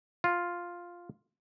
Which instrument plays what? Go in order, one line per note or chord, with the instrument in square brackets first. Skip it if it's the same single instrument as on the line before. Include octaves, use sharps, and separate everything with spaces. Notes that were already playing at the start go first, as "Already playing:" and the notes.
[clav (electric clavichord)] F4